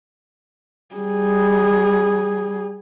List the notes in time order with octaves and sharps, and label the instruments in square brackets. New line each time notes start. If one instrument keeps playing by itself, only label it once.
[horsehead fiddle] G3 G#4